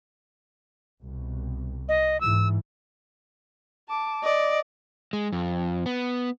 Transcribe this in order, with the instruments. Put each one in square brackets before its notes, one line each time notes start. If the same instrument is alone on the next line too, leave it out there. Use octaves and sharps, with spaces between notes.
[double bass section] C2 B2
[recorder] D#5
[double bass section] G#2 E3 [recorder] E6
[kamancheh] A5 D6
[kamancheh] D5 [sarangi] D#5
[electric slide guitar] G#3
F2
B3